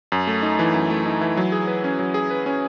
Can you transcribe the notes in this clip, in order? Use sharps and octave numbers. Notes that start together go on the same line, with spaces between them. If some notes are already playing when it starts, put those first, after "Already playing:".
F#2
A3
D#4
E3
F#2
A3
D#4
E3
F#3
G#4
B4
C#4
F#3
G#4
B4
C#4